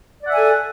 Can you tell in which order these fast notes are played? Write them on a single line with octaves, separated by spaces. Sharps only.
D5 F#5 E5 G#5 A4